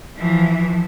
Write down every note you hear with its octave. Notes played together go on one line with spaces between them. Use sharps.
E3 F3